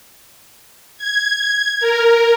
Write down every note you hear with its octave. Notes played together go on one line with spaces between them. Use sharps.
G#6
A#4